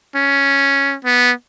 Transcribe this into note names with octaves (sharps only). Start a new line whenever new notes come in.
C#4
B3